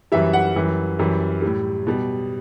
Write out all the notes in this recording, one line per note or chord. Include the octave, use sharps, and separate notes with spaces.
F#2 E3 G3 E5
F#5
F#2 E3 G3
F#2 E3 G3
A2 G3
B2 G3